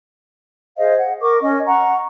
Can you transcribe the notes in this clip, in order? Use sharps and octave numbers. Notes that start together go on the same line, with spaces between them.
G#4 C5 D#5 F5
F#5
A#4 C#6 D6
C#4 D#5
F#5 A#5 C#6